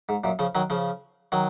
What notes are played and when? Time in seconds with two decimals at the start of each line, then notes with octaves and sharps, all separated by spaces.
0.09 G#2
0.24 F#2 A#2
0.39 C#3 F3
0.55 D#3 F#3
0.70 C#3 F3
1.32 D#3 F#3